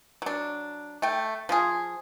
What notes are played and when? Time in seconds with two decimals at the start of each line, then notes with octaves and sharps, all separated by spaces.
0.22 F#3 D4
1.02 A3 G5
1.49 F3 F4 G#4